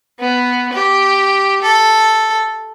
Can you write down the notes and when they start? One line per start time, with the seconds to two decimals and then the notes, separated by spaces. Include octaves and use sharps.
0.19 B3
0.73 G4
1.62 A4